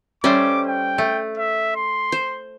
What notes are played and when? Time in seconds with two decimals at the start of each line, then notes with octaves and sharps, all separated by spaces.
0.24 G3 A3 C#4 C5 D6
0.67 G5
0.98 A3
1.38 E5
1.76 C6
2.12 C5